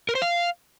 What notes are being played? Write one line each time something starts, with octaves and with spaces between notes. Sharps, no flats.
A#4
C5
F5